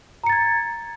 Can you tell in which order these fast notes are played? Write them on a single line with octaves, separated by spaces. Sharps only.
A#5 C#7 A6 G#6